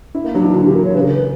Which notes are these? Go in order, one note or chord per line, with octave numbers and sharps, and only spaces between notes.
E4
A#3
F#3 D4
E3
D3 F#4
D3 G4
A#4
D3 C#5
C#3 B4
G4
A#4
B4